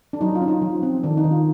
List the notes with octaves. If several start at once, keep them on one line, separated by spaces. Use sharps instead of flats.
D4
F#3 D#4
F4
C#4
D#4
F3
C4
D#3 D4
D#4
D#3
F4